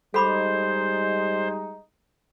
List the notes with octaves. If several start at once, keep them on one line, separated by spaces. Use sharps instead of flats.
G3 G#3 D#4 A4 C5 B5 D6